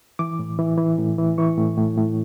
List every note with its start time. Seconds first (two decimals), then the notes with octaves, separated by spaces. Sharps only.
0.19 E3 D6
0.39 A2
0.59 E3
0.78 E3
0.98 A2
1.18 E3
1.38 E3 C#6
1.58 A2
1.78 A2
1.98 A2